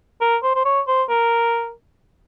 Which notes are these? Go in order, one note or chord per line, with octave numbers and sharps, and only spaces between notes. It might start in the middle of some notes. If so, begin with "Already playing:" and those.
A#4
C5
C5
C#5
C5
A#4